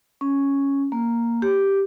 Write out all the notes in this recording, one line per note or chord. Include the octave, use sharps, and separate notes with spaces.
C#4
A#3
G4